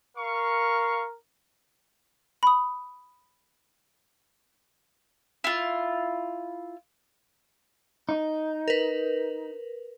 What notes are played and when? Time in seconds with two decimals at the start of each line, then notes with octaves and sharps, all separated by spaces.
0.17 A#4 F5 C#6
2.43 B5 D#6
5.44 E4 F4
8.09 D#4
8.68 A#4 B4